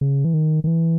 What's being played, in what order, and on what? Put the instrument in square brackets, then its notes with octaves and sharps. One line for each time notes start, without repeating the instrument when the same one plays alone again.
[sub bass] C#3
E3
D#3
D#3
E3